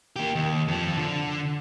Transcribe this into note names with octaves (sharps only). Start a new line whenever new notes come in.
A#3 G4
D#2
F2 F3
D3